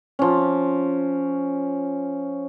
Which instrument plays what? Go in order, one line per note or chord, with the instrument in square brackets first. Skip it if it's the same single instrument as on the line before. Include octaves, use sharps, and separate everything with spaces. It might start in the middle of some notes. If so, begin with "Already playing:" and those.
[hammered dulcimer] F3 C#4